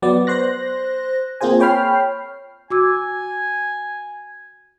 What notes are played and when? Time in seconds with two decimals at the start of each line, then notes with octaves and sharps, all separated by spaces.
0.02 F#3 B3 D5
0.27 C5 C6 F#6 A#6
1.41 A#3 C4 F4 G#4 C5 G#5
1.60 C#5 G5 B5 F6 C7
2.71 F#4 G#5 D6 E6